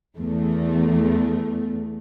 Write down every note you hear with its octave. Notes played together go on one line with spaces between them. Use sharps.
E2 A3